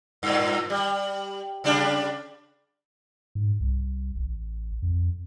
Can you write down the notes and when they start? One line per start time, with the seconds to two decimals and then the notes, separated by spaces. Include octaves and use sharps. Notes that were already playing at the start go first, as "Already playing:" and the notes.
0.23 G2 A#2
0.70 G3
1.64 C#3 G3 D4
3.35 G#2
3.61 C2
4.17 A1
4.82 F2